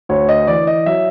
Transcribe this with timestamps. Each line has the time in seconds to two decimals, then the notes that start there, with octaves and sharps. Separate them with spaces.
0.09 D2 C#5
0.29 D#5
0.47 E3 D5
0.67 D#5
0.86 F#3 E5